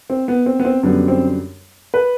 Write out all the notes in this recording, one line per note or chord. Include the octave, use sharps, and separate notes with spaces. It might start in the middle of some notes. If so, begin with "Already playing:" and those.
C4
B3
C4
B3
C4
F#2 D3 G3 B3
C4
B4